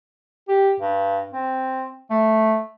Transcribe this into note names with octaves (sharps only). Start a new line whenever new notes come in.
G4
G2
C4
A3